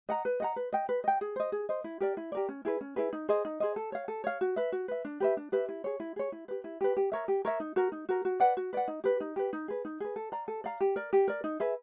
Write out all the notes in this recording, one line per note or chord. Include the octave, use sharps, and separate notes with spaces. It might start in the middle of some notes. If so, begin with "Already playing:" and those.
D#5 F#5 A#5
B4
D#5 F#5 A#5
B4
D#5 G5
B4
D#5 G5
G#4
C5 D#5
G#4
C5 D#5
E4
G4 A#4 D5
E4
G4 A#4 D5
C#4
E4 G#4 B4
C#4
E4 G#4 B4
D#4
G#4 C5 D#5
D#4
G#4 C5 D#5
A4
C#5 F5
A4
C#5 F5
F#4
B4 E5
F#4
B4 E5
D4
G4 B4 E5
D4
G4 B4 E5
E4
G#4 C#5
E4
G#4 C#5
E4
G4 B4
E4
G4 B4
G4
A#4 C#5 E5
G4
A#4 C#5 E5
D#4
F#4 A#4
D#4
F#4 A#4
F#4
B4 D5 F#5
F#4
B4 D5 F#5
D#4
G4 B4
D#4
G4 B4
D#4
G#4 B4
D#4
G#4 B4
A4
D5 F5 A#5
A4
D5 F5 A#5
G4
A#4 D5
G4
A#4 D5
D#4
G#4 B4 E5